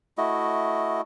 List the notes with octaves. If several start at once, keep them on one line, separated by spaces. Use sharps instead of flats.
A3 E4 F#4 D#5